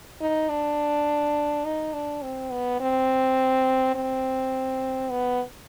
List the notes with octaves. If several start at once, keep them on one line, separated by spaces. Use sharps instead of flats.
D#4
D4
D#4
D4
C4
B3
C4
C4
B3